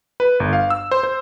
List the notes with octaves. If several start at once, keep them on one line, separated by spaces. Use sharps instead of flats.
B4
G1
F5
E6
C5
C5